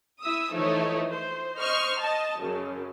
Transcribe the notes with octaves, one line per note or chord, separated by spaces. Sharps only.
E4 E5 D#6 E6
E3 F3 A3 D#4 C#5
C5
C5 D#5 C#6 F6
D#5 A5
F#2 C#3